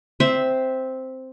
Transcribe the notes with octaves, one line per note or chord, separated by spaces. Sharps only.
C4 C5 E5